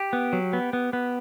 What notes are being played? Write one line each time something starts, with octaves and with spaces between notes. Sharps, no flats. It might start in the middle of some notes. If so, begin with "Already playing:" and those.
Already playing: G4
B3
F#3
B3
B3
B3